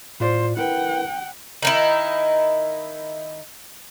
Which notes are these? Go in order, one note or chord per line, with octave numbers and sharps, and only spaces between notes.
A2 F4 C5 D5
E4 A#4 B4 F#5 G5
D#3 D#4 E4